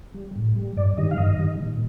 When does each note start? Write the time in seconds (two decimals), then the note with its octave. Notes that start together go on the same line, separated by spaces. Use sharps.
0.14 G3
0.36 A2
0.56 G3
0.77 G2 D5
0.97 D#3 G3 D#5
1.11 F5
1.18 G2 D#5
1.39 D#3 G3
1.60 A#2